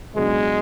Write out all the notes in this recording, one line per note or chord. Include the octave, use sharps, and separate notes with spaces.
C#2 B2 F#3 G#3 B3 D4